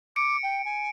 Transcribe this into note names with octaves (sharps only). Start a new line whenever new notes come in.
D6 C#7 D7
G5
G#5